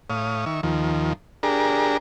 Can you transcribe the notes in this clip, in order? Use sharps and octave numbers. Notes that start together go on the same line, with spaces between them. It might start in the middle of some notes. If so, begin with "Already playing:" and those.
A2 C#5 F5 D#6
D#3 E5 C#6
D#2 D#3 F3
D4 G4 G#4 A#4 A#5